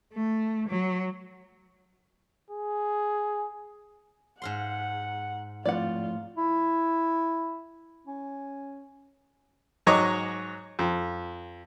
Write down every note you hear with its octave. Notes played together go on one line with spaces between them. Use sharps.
A3
F#3
G#4
G#2 F5 F#5 C6
F2 A2 F4 D5 F#5
E4
C#4
G#2 F#3 C#5 D#5 C#6 D6
F2